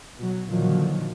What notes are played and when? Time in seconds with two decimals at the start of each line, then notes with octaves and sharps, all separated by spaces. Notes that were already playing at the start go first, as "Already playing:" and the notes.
0.17 B2 F#3
0.49 A#2 D3 D#3 F3 F#3